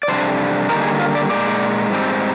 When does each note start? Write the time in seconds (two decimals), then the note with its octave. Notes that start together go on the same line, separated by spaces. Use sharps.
0.03 D5
0.08 F2 C3 G3 D4 C5
0.69 D3 G3 A#3 D#4 A#4
0.84 G#4
1.00 F4
1.15 D5
1.30 A#2 G#3 D#4 D5
1.90 G#2 G3 C4 D#4